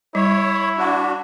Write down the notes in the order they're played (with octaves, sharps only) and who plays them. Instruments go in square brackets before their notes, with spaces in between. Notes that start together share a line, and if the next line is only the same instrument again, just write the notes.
[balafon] G3 [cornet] E4 [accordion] C#5
[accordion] D4 F#4